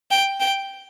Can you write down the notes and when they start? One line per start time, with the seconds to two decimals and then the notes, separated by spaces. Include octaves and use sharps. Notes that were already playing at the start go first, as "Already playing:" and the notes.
0.11 G5
0.40 G5